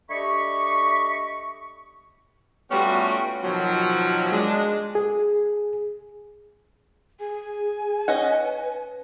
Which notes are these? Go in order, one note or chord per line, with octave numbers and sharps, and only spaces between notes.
A3 D4 G4 D#5 B5 C#6
G3 A3 B3 C#4 F4 F#4
B2 D#3 F3 F#3
G#3 D4
G#4
G#4 G#5
C#4 B4 D#5 F#5